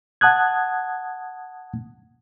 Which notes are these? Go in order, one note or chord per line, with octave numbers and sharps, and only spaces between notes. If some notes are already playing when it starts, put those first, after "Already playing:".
F#5 A5 D#6 F#6 G#6